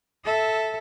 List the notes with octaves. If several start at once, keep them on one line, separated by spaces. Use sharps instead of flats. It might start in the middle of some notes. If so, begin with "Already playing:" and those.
A4 E5